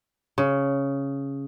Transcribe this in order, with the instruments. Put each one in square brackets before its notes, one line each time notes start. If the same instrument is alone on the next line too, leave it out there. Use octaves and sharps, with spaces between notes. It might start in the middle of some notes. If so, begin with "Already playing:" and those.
[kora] C#3